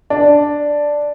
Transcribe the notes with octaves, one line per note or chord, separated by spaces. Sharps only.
D4